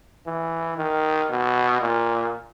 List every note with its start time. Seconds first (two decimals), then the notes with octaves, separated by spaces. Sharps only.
0.26 E3
0.77 D#3
1.29 B2
1.81 A#2